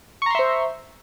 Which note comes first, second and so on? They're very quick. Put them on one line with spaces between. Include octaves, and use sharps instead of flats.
C#6 A#5 C6 E5 C5